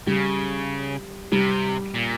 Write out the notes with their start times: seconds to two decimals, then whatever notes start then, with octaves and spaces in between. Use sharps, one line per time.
0.07 C#3 G3
1.32 C3 G3
1.95 A#2